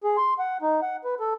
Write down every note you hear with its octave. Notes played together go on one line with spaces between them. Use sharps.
G#4
C6
F#5
D#4
F#5
B4
A4